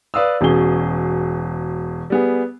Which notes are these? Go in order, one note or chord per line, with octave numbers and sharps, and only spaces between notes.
B4 D5 F5 D#6 E6
E1 B2 C#4 G#4 G7
G3 B3 G#4